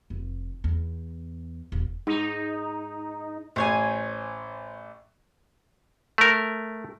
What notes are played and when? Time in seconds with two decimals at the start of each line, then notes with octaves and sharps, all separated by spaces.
0.10 F1
0.64 E2
1.72 E1
2.07 G#2 D#4
3.56 A1 C5 C#5 G#5
6.18 A3 A#4